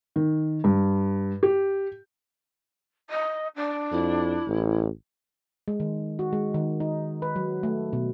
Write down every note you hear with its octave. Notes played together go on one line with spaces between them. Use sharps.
D#3
G2
G4
D#5
D4
F2 E4
A1
G#3
D#3
F#4
G#3
D#3
D#4
B4
F#3
A3
B2